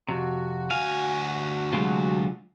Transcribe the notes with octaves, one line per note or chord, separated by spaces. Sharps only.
F2 C3 F#4
D2 F5 G#5
C3 F#3 G#3 F4